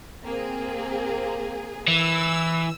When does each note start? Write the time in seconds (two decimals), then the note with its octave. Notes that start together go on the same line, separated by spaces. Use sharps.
0.23 A#3 C4 G#4
1.88 E3 E6